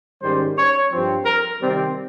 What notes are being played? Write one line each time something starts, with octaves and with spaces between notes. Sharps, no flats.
G#2 D#3 G3 C#4 C5
C#5
G2 F3 C4
A#4
C3 D#3 G3 C4